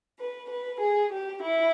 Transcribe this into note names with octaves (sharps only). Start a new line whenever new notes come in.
B4
B4
G#4
G4
E4